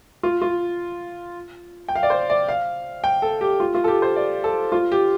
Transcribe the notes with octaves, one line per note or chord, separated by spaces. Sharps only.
F4
F4
G5
F5
D5
C5
D5
F5
G5
A4
G4
F4
F4
A4
G4
C5
D5
A4
F4
G4